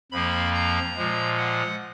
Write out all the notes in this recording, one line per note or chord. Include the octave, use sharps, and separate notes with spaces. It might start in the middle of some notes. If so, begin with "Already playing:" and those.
F2 F3 A#3 B5
A#5
A#2 F3 G#3
F#5